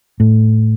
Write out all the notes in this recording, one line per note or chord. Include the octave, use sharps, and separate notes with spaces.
A2